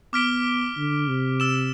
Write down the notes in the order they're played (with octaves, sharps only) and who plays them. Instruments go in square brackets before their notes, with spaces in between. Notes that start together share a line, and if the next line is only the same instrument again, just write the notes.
[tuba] B3 [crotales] D6 F6 B6 D7 G7
[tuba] D3
C3
[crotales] E6 A6 E7 G7